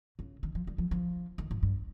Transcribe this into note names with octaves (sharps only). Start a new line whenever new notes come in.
C#3
D#3
F3
G3
F3
F3
D#3
G#2
G2